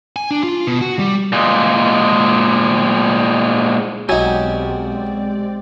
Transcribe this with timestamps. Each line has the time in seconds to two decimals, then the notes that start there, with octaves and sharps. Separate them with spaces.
0.16 G#5
0.31 D4
0.43 F4
0.67 B2
0.81 F#4
0.99 G3
1.33 A#2 G#3
4.09 B1 F#3 G#3 C4 D#4 G4 D5 G#5